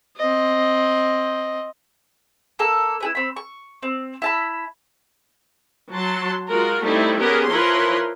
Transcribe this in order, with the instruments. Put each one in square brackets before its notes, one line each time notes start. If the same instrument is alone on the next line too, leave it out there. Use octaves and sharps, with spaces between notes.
[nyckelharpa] C4 D#5
[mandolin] A#3 A4
E4 G#4 B4
C4 B5
C#6
C4
E4 A5 B5
[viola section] F#3 A5 C6
G#3 F4 F#4 A#4
G3 A3 C4 D#4 E4
B3 C#4 G4 G#4 A#4
F3 E4 A#4 B4 C#5 C6